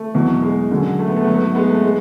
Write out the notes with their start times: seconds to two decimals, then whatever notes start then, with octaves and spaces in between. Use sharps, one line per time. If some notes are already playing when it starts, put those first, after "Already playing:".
Already playing: A3
0.15 E2 B2 F#3
0.42 G#3
0.71 F#2 D3 F#3
0.99 A3
1.08 B3
1.16 A3
1.25 G#2 F#3 B3
1.34 A3
1.55 G#3 B3
1.70 A3
1.84 G#3